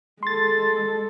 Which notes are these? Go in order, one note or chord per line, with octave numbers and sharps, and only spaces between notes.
G#3 A4 C6 A6